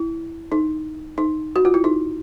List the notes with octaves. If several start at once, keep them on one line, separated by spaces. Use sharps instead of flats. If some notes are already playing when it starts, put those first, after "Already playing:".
Already playing: E4
D#4
D#4
F#4
F4
E4
D#4